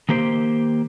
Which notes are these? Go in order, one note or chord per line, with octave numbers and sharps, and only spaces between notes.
D#3 A#3 G4 C5